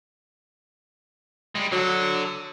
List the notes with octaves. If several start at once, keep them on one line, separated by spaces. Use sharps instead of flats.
G3 G#3
D3 F#3 A4